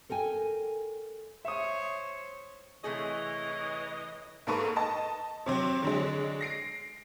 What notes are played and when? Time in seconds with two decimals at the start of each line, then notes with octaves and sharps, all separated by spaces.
0.09 A4 A#4 G5 G#5
1.45 C5 C#5 E5 D#6
2.84 C3 E3 A3 G#4 C#5 D#5
4.47 G#2 A#3 A4 B4 C#6
4.76 D#5 A5
5.46 C3 F#3 C4
5.82 D3 F#3 G#3
6.41 A#6 C7 D7